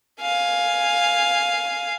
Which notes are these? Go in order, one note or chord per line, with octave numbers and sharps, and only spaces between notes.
F5 G#5